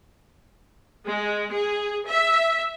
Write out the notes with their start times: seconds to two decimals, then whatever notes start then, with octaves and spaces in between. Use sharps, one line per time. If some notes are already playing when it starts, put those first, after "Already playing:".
1.06 G#3
1.52 G#4
2.06 E5